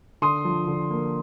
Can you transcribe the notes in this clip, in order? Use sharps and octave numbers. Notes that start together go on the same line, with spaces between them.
D3 C6 D#6
F3
D3
A#3